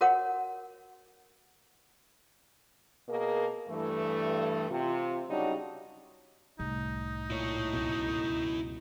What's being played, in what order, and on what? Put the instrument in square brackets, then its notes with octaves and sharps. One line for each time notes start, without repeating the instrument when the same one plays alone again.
[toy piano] F#4 A#4 C#5 F#5
[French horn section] B2 A#3 G#4 A#4
G2 E3 A3
C3 F4
C#3 F#3 G3 D4 D#4 F#4
[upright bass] C2 A2 [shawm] D#4
[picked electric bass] A#2 [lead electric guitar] E4 C#5
[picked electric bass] C#2 F#2 B2